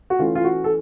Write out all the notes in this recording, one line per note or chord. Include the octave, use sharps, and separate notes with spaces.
F#4
E3 A3 C#4 F4
F4
F#4
A4